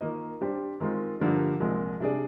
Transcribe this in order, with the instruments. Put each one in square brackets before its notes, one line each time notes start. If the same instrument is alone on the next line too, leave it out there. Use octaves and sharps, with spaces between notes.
[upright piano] D#3 A#3 F4 A#4 D#5
G3 D4 G4 C5
D#3 G#3 C4 F4
G2 D3 F3 A#3 D4
C2 A#2 F3 G#3
C3 G3 D4 G#4 D5